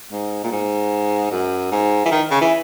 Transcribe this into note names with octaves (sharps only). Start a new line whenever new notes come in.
G#2
A#2
G#2
F#2
G#2
E3
D#3
C#3
E3